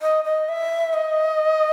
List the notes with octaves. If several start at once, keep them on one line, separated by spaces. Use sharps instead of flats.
D#5
D#5
E5
D#5